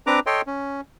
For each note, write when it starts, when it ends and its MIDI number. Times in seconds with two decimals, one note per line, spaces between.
0.07 0.20 60
0.07 0.20 62
0.07 0.20 71
0.07 0.20 82
0.07 0.20 86
0.26 0.41 69
0.26 0.41 73
0.26 0.41 75
0.26 0.41 79
0.26 0.41 84
0.47 0.81 61